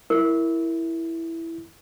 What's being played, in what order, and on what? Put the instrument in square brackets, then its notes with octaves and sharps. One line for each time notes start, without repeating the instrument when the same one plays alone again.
[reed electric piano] E4 [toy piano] A#4